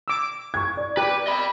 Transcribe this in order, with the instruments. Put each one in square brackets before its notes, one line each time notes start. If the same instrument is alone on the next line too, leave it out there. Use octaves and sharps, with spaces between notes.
[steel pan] D6 E6
[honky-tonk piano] C#6 G#6
D5
[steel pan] G4 [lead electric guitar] B4
[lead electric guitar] D#5 B5